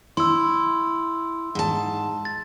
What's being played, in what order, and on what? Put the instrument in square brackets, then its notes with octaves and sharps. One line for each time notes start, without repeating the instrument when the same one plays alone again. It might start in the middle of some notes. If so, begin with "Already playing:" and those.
[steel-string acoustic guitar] E4 [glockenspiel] C6 E6
[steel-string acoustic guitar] G#2 A5
[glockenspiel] A6